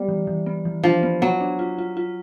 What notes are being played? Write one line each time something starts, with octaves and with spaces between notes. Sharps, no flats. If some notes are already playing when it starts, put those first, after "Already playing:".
Already playing: G3 B3
E3
E3
B3
E3
F3 D4
B3
F#3 B3
D4
F4
F4
F4